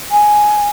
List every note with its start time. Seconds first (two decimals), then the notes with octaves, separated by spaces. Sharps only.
0.11 G#5